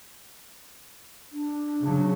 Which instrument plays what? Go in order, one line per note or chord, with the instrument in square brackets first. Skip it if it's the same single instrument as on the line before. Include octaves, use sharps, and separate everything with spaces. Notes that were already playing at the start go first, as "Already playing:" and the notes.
[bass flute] D4
[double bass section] C#3 F#3